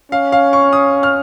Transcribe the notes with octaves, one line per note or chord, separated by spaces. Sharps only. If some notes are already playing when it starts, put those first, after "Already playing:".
C#4 F5
F5
C#6
D#6
F6